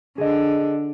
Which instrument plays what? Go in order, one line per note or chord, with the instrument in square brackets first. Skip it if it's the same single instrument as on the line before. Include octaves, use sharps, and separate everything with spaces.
[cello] D3 [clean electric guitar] G#4 D#5